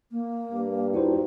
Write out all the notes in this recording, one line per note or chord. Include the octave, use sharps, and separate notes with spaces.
A#3
G2
D#4 E4 F#4 C5